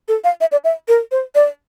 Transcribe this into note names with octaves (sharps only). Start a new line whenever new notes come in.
A4
F5
E5
D5
E5
A#4
C5
D5